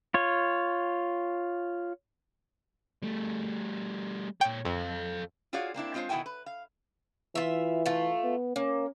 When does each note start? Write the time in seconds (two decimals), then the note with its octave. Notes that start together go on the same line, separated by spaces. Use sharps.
0.14 F4 C#5
3.03 G3 A3
4.41 A#2 C#5 G5
4.65 F2 A4 F5
5.53 F4 F#4 G#4 C#5 D5 F5
5.74 A#3 C4 D4 E4
5.94 G#3 C4 F4 C5 C#5
6.09 B2 D#3 E4 F#4 G5 G#5
6.26 B4
6.46 F5
7.35 E3 F4 E5
7.86 A3 F4
8.24 B3
8.56 A#3 C#4